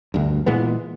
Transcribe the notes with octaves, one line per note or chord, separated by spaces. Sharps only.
D2 G2
A#2 E3 G#3 B3